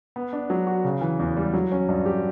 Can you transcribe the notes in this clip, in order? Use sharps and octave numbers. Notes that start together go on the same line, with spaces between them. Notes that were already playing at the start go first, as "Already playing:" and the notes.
B3
D4
F#3
F#4
C#3
E3
E2
G3
F#3
C#4
G2
G4